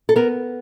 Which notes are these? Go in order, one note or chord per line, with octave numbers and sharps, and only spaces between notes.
A4
B3 A#4